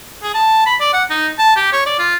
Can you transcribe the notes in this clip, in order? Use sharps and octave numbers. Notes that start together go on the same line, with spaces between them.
G#4
A5
B5
D5
F#5
D#4
A5
G4
C#5
D5
F4